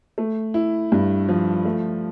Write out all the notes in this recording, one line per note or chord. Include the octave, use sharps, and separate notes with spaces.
A3
E4
G2
F3
A3